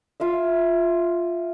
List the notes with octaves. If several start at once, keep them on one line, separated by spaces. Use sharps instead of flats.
F4 E5 F5